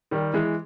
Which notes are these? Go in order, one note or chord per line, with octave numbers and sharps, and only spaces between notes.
D#3 G3
E3 G#3